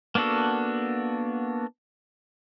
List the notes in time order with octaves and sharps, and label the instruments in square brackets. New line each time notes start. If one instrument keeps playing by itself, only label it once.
[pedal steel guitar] A#3 B3 D4 F#4 A4